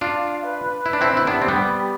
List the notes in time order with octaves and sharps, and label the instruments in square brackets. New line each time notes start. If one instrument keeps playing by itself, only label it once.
[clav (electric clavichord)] D4 F4 [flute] F5
[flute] B4
[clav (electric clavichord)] E4
D4
C4 E4
E4
[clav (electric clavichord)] B3 D4 [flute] G4
[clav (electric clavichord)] C4
G3 B3